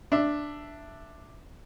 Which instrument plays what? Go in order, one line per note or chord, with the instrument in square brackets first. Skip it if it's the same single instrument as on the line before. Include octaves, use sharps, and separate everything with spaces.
[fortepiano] D4 E5